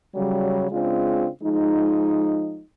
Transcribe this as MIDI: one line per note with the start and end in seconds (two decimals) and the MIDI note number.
0.15 0.66 49
0.15 0.66 54
0.15 0.66 55
0.71 1.28 49
0.71 1.28 56
0.71 1.28 60
0.71 1.28 62
0.71 1.28 65
1.43 2.62 53
1.43 2.62 56
1.43 2.62 63